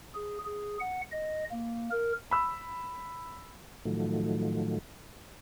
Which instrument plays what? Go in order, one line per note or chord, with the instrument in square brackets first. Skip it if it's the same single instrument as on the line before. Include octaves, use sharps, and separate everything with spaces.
[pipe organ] G#4
G#4
F#5
D#5
A#3
A#4
[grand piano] B5 E6
[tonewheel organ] A2 D#3 F3 F#3 A3